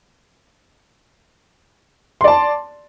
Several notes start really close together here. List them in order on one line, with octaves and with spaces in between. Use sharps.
C6 D5 A5